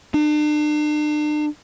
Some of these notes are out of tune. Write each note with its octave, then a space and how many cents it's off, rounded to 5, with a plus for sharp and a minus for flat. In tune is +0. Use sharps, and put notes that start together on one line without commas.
D4 +40